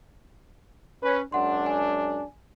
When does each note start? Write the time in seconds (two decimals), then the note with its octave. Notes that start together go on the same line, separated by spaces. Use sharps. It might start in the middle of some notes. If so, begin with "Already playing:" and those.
1.03 C#4 B4
1.32 F#2 G#3 D4 F#5 C6
1.66 G#5